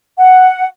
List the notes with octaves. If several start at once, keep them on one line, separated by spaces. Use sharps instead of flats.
F#5